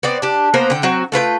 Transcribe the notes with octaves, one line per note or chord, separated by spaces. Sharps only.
B3 C4 D5
D4 G4
A#3 B3 A#4 C5
D3 G5
F#3 C4 F#4
A3 F4 B4 G5